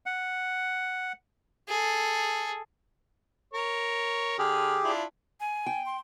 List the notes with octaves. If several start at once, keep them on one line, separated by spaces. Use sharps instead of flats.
F#5
G#4 A4
A#4 C#5
D3 G4 G#4 F6
D4 E4 F4
G#5
G5
C6